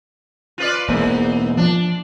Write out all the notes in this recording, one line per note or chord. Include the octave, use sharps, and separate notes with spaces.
F4 B4 D5
E1 G#2 A#3 B3 E4
F3 D4